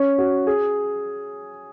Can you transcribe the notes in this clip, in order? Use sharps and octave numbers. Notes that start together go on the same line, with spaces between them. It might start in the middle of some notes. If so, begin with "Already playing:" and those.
Already playing: C#4
F#4
G#4